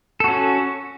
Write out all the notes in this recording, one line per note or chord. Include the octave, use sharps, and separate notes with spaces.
C#4 F#4 A4